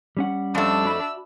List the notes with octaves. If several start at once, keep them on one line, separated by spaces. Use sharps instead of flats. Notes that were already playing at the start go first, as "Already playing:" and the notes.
G3 C#4 F#5
F2 A3 D4 E6
F#4 E5 B5